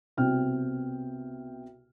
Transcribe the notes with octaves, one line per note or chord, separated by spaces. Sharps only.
C2 B2 C4 G5 F6